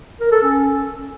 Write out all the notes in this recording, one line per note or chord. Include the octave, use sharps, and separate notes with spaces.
A#4
A4
C#4